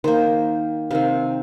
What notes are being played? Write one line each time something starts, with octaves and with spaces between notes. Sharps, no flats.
D#3 A#3 C5
C3 D#3 C4 F5